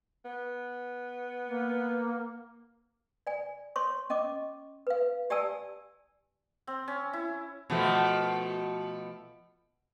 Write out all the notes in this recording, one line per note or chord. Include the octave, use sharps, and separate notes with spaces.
B3
A#3
D5 G#5
C#5 C6 C#6
C#4 D#5 C#6 D6
B4 F5
G4 D5 G#5 A5 E6
C4
C#4
E4
B2 F3 A3